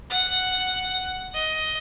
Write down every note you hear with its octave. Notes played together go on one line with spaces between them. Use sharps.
F#5
D#5